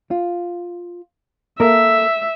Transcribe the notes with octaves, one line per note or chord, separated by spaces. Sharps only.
F4
A#3 A4 A#4 E5